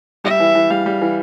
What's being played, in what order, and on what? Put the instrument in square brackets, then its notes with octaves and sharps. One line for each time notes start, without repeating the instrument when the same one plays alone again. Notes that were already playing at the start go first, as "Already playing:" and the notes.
[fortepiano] G3 [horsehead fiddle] E5
[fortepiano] E3
E3
[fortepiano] G3 [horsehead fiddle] F5
[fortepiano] G3
E3